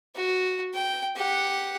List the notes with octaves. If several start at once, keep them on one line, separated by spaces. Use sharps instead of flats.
F#4
G5
G4 F#5